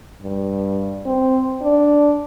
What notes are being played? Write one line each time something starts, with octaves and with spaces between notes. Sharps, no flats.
G2
C4
D4